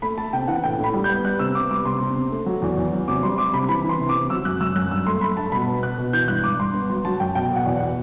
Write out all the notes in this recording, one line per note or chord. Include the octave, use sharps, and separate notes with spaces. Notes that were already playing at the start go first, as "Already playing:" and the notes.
A3 B5
A3 A5
C3 G5
E3 F#5
A2 G5
A2 B5
G3
G6
B3
G3 F#6
C3 E6
B3 D6
G3 D6
C3 C6
C3
C3
A3
F#3
E2
E2
F#3
C3 D6
G3 C6
G3 D6
C3 B5
E3 B5
E3
C6
C3
D6
C3
F#3 E6
F#2 F#6
F#2 E6
F#2 F#6
G2 E6
A3 C6
A3 B5
G2 A5
B2 B5
B3
B3 F#6
B2
E3 G6
G2 F#6
G2 D6
G2 C6
B3
F#3 C6
F#3 A5
F#2 G5
B2 G5
B2
F#5
E2
F#5
B2